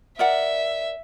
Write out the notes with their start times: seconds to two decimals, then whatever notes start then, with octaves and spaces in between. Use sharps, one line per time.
0.19 A#4 D5 E5 F#5